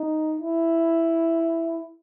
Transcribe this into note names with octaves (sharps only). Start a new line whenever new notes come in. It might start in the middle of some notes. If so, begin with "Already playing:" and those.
Already playing: D#4
E4